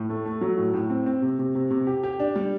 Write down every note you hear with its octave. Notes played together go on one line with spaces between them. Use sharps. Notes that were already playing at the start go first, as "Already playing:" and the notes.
Already playing: A2
A3
A3
F#3
A2
A2
C4
C4
C3
C3
C3
C3
G4
G4
D4
G3